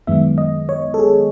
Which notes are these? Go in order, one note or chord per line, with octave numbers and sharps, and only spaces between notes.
F#2 D#3 G#3 B3 E5
D#5
C#5
A4
G#4